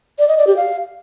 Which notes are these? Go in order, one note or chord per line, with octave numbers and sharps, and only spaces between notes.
D5
D#5
D5
G4
F5